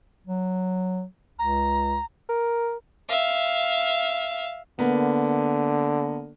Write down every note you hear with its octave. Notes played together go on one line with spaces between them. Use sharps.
F#3
C#2 A#5
A#4
E5 F5
D3 A#3 B3